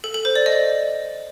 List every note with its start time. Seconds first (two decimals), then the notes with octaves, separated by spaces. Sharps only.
0.04 A4
0.14 A4
0.25 C5
0.36 D5
0.46 D#5